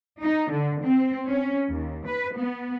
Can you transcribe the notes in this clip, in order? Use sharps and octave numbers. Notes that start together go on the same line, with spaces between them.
D#4
D3
C4
C#4
D#2
B4
B3